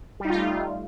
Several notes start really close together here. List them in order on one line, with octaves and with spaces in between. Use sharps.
G3 D#4 F4 A3